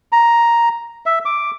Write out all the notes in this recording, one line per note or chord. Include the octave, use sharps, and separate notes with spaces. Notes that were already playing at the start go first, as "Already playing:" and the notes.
A#5
E5
D6